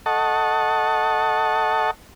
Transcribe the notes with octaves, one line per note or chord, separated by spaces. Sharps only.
A4 D#5 F#5 A5 C#6